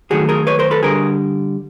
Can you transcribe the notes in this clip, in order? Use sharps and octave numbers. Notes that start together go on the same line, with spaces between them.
F#2 D#3 F#3 A3 F#4 G#4
G#4 A#4
B4 C#5
A#4 C5
A4 B4
D3 G3 G#4 A#4